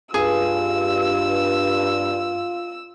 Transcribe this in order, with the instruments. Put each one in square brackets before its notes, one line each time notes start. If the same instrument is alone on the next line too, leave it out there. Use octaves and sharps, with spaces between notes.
[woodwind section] G2 [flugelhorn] F4 [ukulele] G#4 [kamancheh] E6